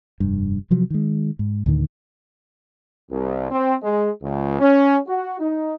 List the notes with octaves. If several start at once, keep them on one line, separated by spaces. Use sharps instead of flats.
F1 G2
C3 F3 F#3
D#3 G#3
G#2
D2 A2 D3 D#3
C2
C4
G#3
C#2
C#4
F#4
D#4